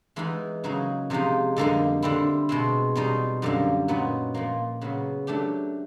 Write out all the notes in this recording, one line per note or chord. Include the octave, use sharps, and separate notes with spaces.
E3 G#3 B3 D#4 G#4
C#3 F#3 A#3 D#4 G#4
C3 F3 G#3 C4 D#4
F2 D3 G3 A#3 D#4
D3 G3 C4 E4
B2 G#3 C4
B2 G3 C4 D#4
F#2 D3 G3 A#3
A#2 F#3 B3 D#4 F#4
A#2 F3 A#3
C#3 F#3 B3
F#3 A3 D4 G4